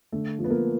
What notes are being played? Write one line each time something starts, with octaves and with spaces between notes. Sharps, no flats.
D3 A3
F3
B3
A#3